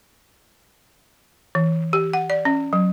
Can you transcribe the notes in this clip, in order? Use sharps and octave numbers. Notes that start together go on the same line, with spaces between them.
E3
G4
F#5
D5
C#4
F#3